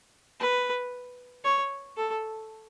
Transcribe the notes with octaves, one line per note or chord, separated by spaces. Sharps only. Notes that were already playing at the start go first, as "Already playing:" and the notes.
B4
C#5
A4